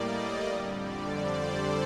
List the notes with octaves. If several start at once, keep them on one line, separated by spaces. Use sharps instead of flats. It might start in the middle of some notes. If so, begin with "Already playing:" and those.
Already playing: A2 G3 A#3 D5 D#5
F2 D3 G3
D5
C5
A4